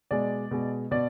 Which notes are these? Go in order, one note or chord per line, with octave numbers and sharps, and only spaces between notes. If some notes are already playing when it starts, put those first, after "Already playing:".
B2 G#3 D5
B2 G#3
B2 D5